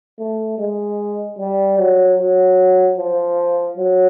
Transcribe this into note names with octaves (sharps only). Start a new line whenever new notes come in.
A3
G#3
G3
F#3
F#3
F3
F#3